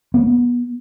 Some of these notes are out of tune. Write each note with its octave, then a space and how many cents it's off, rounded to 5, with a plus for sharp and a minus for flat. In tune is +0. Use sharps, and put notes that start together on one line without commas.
B3 -25